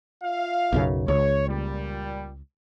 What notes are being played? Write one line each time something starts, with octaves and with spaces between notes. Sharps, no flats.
F4 E5 F5
B1 F#2 C#3
C#2 C#5
A#2 G3